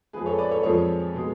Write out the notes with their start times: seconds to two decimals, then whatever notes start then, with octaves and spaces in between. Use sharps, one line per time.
0.13 F2 F3 G#3 G#4 B4
0.26 A4 C#5
0.38 B4 D5
0.51 A4 C#5
0.63 F2 F3 G#3 A4 C#5
1.14 B2 G#3